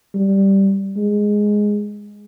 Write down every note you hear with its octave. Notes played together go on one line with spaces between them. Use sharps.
G3
G#3